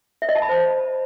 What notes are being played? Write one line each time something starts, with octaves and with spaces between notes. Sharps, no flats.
E5
D#5
A5
B5
C5